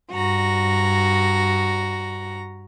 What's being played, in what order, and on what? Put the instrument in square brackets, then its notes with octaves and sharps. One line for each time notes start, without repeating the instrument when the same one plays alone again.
[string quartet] G2 F#4 A#5